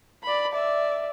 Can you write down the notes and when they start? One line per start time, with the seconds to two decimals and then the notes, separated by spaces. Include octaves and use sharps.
0.23 D5 B5
0.52 D5 E5